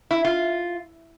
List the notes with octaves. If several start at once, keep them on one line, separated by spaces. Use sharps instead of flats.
E4
F4